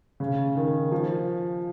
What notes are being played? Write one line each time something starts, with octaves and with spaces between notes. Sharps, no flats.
C#3
D#3
F3